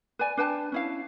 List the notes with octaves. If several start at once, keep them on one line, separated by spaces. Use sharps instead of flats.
B4 D5 G#5
D4 B4 G5 A5
C#4 E4 F5